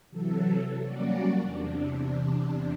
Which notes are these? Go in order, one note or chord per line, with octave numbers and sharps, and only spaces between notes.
C3 E3 F#3 A4
F#3 G3 A#3 C#4 F#4 D5
E2 C3 D4